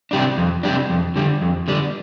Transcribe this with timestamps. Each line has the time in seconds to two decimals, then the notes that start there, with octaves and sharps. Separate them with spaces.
0.11 C3 G3 D4
0.37 F2
0.63 C3 G3 D4
0.90 F2
1.16 D3 G3
1.42 F2
1.68 D3 G3